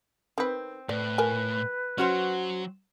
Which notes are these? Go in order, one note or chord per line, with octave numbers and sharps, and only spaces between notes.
D#3 C4 B4
A2 B4 D5
F3 A#4 G#5
F#3 C#4 F#4 C5